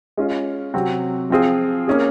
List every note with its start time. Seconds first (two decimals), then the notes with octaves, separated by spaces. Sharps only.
0.17 G#3 C#4 F4
0.74 C3 F#3 C4 F#4
1.30 F3 C4 F4 G#4
1.88 A#3 C#4 G#4